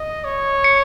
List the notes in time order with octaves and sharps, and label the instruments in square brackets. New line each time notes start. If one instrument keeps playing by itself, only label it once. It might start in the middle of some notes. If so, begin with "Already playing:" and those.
Already playing: [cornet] D#5
C#5
[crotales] C#7